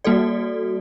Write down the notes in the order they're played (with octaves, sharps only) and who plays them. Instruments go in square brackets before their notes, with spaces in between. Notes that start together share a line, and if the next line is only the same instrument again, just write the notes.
[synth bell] G3 A#3 F#4 A4 D5